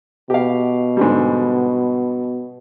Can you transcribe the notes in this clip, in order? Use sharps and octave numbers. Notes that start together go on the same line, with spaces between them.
B2 G4 F5
G#2 D3 G3